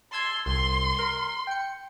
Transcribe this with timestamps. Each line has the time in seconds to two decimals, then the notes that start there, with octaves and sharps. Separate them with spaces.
0.13 A5 C6 E6 G#6
0.46 C2 C6
0.99 A#4
1.47 G5 C#7